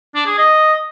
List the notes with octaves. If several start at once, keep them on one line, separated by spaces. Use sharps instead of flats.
D4
G#4
D#5